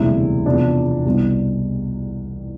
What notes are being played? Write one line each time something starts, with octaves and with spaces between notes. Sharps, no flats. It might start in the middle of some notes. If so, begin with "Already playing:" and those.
Already playing: E1 D2 C3 G3 E4
E1 E2 C3 F3 D4
C2 B2 G3